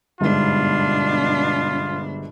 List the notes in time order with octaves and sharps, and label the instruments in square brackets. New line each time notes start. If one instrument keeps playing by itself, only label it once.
[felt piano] G1 G#2 [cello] B2 D4 [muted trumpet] F4